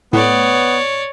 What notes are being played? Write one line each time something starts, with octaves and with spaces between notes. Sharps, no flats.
A2 B3 C#5 D5